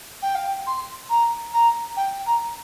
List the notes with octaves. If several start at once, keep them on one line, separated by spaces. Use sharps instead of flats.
G5
F5
G5
C6
A#5
A#5
G5
A#5